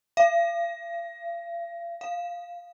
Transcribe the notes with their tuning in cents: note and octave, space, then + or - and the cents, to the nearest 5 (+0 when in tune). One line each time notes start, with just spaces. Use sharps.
F5 -40
F5 +0